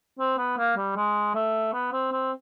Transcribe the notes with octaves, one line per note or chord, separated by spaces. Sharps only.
C4
B3
A#3
G3
G#3
A3
B3
C4
C4